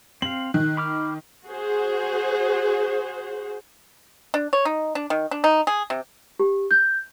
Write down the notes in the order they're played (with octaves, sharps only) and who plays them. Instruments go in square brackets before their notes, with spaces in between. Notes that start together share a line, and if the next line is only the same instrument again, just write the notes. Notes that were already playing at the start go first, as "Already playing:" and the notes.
[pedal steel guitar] C4 F5 [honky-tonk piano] F#7
[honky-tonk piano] D#3 [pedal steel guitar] F#6
[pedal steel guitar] B5 D6 F6
[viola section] F#4 G#4 C5
[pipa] D4
C#5
D#4
D4
D#3
D4
D#4
G#4
C3
[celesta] G4
G6